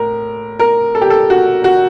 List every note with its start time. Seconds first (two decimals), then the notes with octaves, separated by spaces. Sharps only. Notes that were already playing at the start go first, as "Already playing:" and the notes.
Already playing: A2 A#4
0.59 A#4
0.95 A4
1.01 G4
1.10 A4
1.30 F#4
1.64 F#4